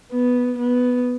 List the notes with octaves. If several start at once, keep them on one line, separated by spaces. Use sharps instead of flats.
B3
B3